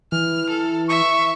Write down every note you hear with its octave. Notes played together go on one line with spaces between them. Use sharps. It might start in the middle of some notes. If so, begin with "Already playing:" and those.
E3 F6
A4
E5 C#6